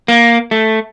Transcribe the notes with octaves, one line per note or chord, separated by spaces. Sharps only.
A#3
A3